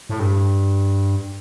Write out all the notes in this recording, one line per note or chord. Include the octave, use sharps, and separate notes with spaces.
A2
G2